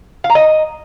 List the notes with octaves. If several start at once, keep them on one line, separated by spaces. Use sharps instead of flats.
F5
A#5
D#5